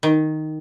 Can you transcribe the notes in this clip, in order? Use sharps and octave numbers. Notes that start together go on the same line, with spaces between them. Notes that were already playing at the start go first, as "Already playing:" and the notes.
D#3